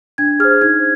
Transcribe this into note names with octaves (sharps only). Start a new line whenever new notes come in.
D4 G#6
G#4 C5 F6
D#4 G#6